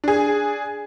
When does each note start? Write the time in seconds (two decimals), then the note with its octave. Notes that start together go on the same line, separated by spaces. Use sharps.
0.04 D4 G#4